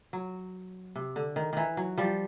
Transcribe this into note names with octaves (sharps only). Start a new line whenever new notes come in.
F#3
C3
D3
D#3
D#3 E3
F#3
F3 G3